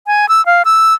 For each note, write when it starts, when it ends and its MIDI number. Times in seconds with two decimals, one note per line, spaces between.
0.07 0.28 80
0.29 0.44 88
0.46 0.63 77
0.65 0.94 88